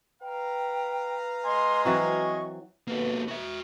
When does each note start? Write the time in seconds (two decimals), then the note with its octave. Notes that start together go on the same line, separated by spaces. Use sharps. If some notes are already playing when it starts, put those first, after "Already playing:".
0.22 B4 F5 G5 A#5
1.45 D#5 G#5 C6
1.85 E3 F#3 C4 C#6
2.88 D#2 B2 A#3 B3 A4
3.28 F#4 E5